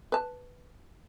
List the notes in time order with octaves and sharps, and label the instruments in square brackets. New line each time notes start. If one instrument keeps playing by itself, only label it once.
[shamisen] B4 A5